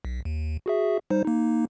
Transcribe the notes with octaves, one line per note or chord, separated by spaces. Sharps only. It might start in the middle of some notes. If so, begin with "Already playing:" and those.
B1
D#2
F#4 G#4 E5
G3 D#4 C5
A#3 D#4